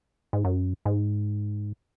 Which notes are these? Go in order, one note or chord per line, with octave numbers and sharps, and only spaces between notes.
G#2
F#2
G#2